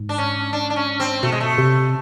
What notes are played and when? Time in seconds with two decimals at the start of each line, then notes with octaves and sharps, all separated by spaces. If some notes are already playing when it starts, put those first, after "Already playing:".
Already playing: G#2
0.09 D4
0.18 C#4
0.53 D4
0.70 D4
0.76 C#4
1.00 C4
1.23 B2 A3
1.32 G#3
1.40 A3
1.58 C3